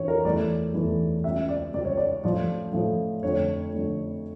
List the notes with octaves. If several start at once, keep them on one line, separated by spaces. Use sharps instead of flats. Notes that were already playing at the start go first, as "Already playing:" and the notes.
Already playing: G2 E3 G3 C#5
A#4
E2 E3 A3 D5
E2 E3 A3
C#2 C#3 G3 E5
D5
C#2 C#3 G3 D5
C#5
D5
A2 F3 A3 D5
A2 F3 A3
F2 D3 A3 C#5
F2 D3 A3